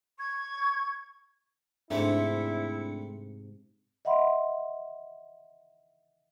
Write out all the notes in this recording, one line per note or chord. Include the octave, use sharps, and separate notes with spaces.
C#6 G#6
G#2 C3 A3 C4 D4 E4 C#7
D#5 E5 F#5 B5 C6